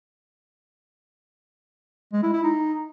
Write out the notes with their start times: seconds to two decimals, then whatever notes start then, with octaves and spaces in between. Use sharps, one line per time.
2.12 G#3
2.23 E4
2.33 E4
2.43 D#4